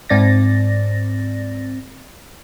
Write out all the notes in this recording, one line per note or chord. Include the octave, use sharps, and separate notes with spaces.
G#2 C4 D5 A6 A#6